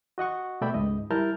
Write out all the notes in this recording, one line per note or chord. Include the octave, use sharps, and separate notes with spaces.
F#4 D#5 F#5 C#6
B2 A3 D5 E5 G5 B5
C#2 G#2 D#5
G3 E4 A#4 A5 F6 G6